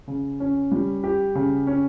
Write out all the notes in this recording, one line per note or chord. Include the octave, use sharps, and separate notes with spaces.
C#3
C#4
G3
G4
C#3
C#4